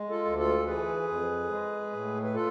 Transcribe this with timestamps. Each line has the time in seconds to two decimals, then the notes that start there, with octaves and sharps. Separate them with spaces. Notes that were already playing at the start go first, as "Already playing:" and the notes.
Already playing: G#3
0.10 F4 A4
0.25 D2
0.38 F4 A4
0.66 E3 G#4 B4
1.08 F2
1.50 G#3
1.93 A2
2.24 B4
2.34 F4 A4